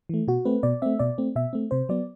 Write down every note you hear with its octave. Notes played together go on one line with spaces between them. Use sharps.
E3 A3
B2 F#4
A3 C4 B4
B2 D5
A3 C4 E5
B2 D5
A3 C4
B2 E5
A3 C4
C3 C5
F#3 B3 D5